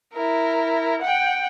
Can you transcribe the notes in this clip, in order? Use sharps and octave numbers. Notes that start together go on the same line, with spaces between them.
E4 A#4
F#5 G5